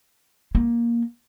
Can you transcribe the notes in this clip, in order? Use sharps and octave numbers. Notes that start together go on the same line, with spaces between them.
A#3